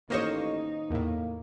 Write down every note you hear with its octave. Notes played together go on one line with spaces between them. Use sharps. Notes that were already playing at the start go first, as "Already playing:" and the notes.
A1 D#3 A#3 D#4 C5 C#5 D#5 F5
E2 A2 A#3